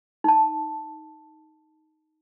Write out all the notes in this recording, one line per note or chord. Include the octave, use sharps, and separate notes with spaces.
D#4 A5